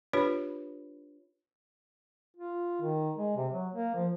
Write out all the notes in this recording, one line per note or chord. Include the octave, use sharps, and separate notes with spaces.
D4 F4 G4 B4 C#5 B5
F4
D#3
G#3
C3
F#3
A#3
F3